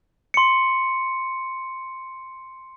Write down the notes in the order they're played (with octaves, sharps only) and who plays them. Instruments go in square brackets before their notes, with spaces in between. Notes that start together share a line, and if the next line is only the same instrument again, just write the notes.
[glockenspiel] C6 C#7